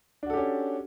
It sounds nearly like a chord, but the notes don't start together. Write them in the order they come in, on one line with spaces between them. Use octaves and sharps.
D4 F#4 A4 G4 C#4